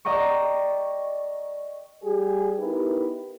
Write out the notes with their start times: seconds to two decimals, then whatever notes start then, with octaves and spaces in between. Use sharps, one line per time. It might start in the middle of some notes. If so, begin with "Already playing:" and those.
0.05 D5 D#5 G5 A#5 C#6
2.03 G3 G4 G#4
2.59 B3 D#4 E4 G4 A#4 B4